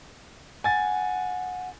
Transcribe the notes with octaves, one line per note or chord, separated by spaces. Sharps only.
F#5 G#5 A6